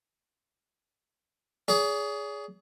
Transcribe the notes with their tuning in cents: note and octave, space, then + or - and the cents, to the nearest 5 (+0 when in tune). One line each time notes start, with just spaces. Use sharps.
G#4 +0 C#5 +45